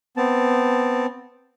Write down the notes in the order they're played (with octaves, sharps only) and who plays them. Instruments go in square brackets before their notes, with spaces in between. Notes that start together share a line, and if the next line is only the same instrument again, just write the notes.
[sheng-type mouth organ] B3 C4 A5